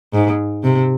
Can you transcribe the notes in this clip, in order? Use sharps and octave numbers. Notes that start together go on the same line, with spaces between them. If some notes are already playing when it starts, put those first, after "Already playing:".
G#2
C3